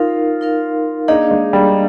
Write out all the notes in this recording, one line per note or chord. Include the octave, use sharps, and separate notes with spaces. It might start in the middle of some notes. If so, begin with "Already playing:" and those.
Already playing: D#4 F4 A#4 F5
D#4 A#4 F5
A#3 D4 D#4 G#4 D5 F5
G#3
G3